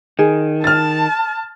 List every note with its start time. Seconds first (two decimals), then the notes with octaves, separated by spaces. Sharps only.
0.19 D#3 G#4
0.64 A5 F6 A6